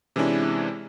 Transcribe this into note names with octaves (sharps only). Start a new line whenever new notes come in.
C3 E3 G#3 C#4 D4 E4